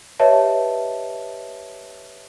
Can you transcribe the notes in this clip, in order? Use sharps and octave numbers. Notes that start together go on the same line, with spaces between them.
G4 B4 C#5 D#5 E5 A5